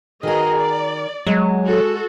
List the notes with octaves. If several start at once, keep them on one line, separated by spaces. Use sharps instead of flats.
D#3 F#4 G#4 A#4 D#5
D5
F#3 G#3
F#4 A4